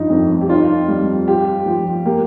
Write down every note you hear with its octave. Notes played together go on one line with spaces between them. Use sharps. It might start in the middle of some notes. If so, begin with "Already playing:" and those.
Already playing: G2 F3 D#4
F2
G4
D#4 F4
G3
F4 G4
F3
A#3 G4